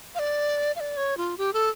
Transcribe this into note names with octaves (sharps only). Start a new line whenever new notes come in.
F5
D5
F5
D5
C#5
F4
G4
A4